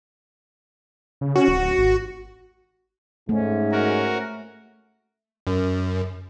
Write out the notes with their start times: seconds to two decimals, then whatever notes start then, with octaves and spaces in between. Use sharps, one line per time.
1.21 C#3
1.36 C#4 F#4
1.48 D1
1.78 G#1
3.29 G#2 A3 C#4
3.72 F#4 A#4
5.47 F#2